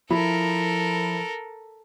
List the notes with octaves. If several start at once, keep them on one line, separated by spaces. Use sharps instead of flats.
F3 E4 A4 A#4 B5